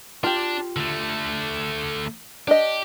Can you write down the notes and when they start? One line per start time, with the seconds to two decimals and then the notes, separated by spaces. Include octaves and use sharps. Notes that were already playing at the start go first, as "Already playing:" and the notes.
0.24 D4 F4 G4
0.76 D3 A3
2.48 D4 G4 D#5